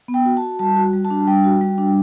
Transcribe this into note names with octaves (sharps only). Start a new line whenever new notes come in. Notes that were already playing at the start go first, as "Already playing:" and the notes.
B3
G5
F#4
A5
F#4
G3 A5
F#4
G3
A5
D4
G3 G5
F#4
G3
D4